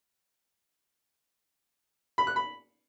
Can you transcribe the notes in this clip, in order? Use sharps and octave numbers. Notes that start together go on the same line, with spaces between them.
B5
F#6
B5